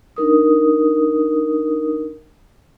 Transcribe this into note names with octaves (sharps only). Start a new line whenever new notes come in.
D4 D#4 A#4 D#6